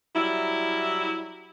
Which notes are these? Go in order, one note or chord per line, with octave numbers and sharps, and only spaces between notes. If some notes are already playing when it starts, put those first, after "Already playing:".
F#3 G3 E4